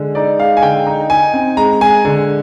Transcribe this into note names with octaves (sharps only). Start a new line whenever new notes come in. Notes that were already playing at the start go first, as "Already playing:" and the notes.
Already playing: D3 G#3
D#4 D5
G#3 F5
G#5
D3 G5
D#4
D#4 G#5
C4
G#3 A#5
G#3 G#5
D3